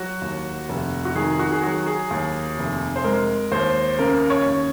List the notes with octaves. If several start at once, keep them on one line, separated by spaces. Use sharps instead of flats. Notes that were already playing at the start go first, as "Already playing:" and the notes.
Already playing: F#3 F#4
D#2
F1
F#4
D#3 G#4
F#4
G#4
F#3 F#4
G#4
D#2
F1
C5
G#3 A#4
D#2 C5
C#3 A#4
C#5
D#2